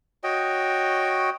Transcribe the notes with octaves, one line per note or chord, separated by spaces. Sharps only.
F#4 C#5 D#5 G5